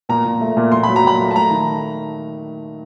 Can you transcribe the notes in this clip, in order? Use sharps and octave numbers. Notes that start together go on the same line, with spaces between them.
A#2 A#5
A#2
A3
A#2
A#2 C6
F#3 B5
A#5
A#2 B5
A3
A5
A3 A#5
D#3